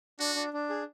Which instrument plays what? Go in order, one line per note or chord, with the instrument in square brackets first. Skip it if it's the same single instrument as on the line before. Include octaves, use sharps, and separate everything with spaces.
[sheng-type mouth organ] D4 [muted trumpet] F#4
[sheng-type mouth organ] D4
D4
G#4